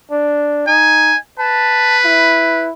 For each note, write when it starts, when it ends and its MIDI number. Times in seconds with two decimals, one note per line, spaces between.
0.11 0.64 62
0.67 1.14 63
0.67 1.17 80
1.39 2.67 71
1.39 1.98 81
2.05 2.71 64